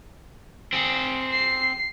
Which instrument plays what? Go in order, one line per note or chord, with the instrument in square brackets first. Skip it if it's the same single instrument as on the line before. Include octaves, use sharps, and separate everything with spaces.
[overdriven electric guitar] C4 G#4
[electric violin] C7